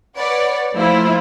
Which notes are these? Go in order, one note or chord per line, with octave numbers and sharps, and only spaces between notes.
B4 C#5 D5 F#5
F3 A3 A#3 E4 F4 C5